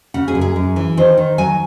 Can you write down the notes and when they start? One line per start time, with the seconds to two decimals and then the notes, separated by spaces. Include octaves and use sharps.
0.14 C#3 F#5
0.28 G#4
0.35 F#2
0.41 G#4
0.56 F#2
0.76 E3
0.97 D#3 C5
1.17 D#3
1.38 F#3 G#5